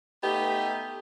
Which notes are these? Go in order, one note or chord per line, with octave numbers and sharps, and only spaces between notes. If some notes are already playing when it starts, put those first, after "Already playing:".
A3 B3 D#4 G4